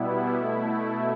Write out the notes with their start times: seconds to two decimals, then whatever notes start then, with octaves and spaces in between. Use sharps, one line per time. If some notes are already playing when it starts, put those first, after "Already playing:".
Already playing: B2 G3 B3 E4
0.38 B2 A3 E4